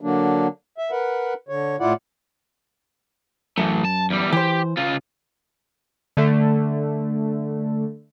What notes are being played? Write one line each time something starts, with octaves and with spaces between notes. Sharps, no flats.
D3 F#3 A#3 D4
E5
A#4 B4 F#5
D3 C#5
A2 E4 F4 D5 F#5
F#2 E3 A3
A5
E2 G3
E3 G4 C5
C#3 F4
D3 A3